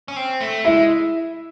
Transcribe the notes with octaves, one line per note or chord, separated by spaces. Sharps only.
C#4
C4
A3
G#3 E4 E5